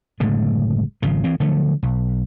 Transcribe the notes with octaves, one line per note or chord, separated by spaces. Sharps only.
F#1 A2 D3 G#3
G#1 C#3 F3
E3 C4
D3 F3 F#3 A3
B1